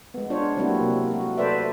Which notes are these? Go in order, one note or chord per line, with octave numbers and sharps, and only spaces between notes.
G#3 B3
D4 F4 C5 C#5
F#3 G3 A#3 C4 E4 F#4
C3 A#3
A3 F#4
A4 B4 C5 D5 E5